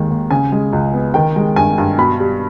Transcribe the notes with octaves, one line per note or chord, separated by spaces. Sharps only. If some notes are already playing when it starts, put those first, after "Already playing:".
Already playing: D#2 D#3 G#3
D#2
C#3 G#5
G#3
C#2
B3
D#3 G5
G#3
G2 G#5
G2
B2 B5
G3